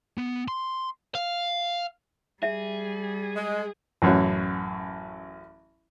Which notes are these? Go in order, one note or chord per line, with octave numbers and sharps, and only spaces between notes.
B3
C6
F5
G3 G#4 E5
G#3
A1 F#2 F#4 C#5